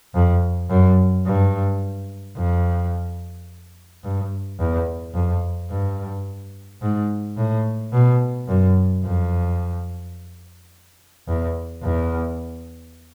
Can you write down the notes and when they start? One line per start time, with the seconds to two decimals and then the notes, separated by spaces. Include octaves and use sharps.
0.14 F2
0.69 F#2
1.26 G2
2.36 F2
4.04 G2
4.59 E2
5.14 F2
5.70 G2
6.82 G#2
7.37 A2
7.92 B2
8.48 F#2
9.04 F2
11.27 E2
11.82 E2